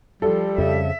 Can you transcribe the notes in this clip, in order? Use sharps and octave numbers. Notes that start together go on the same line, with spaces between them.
F3 G3 A4
F2 C#3 E5